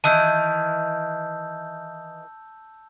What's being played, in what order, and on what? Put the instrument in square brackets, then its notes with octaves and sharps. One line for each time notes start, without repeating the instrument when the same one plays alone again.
[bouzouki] D#3 E3 [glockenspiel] A5 E6 G6